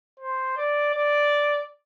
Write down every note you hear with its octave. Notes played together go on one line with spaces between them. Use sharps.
C5
D5
D5